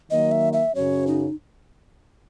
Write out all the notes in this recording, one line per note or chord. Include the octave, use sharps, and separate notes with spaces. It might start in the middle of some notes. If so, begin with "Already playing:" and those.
D#3 F#3 A#3 D#5
E5
E5
F#2 C#3 F#3 C#4 C#5
D#4